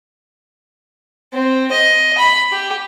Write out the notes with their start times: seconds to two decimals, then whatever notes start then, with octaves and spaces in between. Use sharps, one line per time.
1.33 C4
1.72 D#5
2.18 B5
2.52 G4